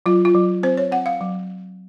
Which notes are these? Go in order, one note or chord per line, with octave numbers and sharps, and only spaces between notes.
F#3 F4
F4
F#3
C4 C5
C#5
C4 F#5
F5
F#3